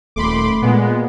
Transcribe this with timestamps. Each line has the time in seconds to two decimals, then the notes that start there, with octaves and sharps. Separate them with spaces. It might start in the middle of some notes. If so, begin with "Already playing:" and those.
0.16 D#1 A3 B5 C6 D6
0.62 A#2 G#3 B3